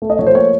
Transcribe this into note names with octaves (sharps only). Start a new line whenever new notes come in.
A3
D#5
F3 C#5
C5
A#3 C#5